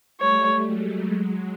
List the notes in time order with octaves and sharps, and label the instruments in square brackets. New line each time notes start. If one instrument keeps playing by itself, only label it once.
[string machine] G3 A3 [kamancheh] C#5
[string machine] F#3 G#3
F#3 G#3